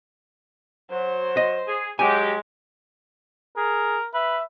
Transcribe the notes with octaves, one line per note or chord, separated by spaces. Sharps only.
F#3 C5
D#5
G#4
F#3 G#3 G4 G#5
G#4 A#4
B4 E5